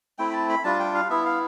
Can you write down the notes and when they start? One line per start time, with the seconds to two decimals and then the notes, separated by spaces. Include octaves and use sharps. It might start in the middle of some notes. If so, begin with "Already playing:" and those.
0.18 A3 C4 E4 G5
0.30 B5
0.33 A5
0.49 B5
0.64 G3 D4 F4 A5
0.79 G5
0.94 F5
1.10 B3 E4 E5
1.25 F5